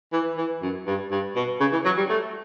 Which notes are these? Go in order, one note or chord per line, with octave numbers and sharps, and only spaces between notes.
E3
E3
F#2
G2
G2
B2
C#3
E3
F#3
G3
A3